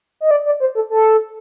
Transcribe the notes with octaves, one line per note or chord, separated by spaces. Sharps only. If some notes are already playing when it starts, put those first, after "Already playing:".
D#5
D5
D5
C5
A4
A4